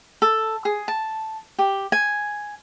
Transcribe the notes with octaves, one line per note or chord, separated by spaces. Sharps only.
A4
G#4
A5
G4
G#5